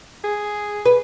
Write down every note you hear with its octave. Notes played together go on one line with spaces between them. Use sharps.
G#4
B4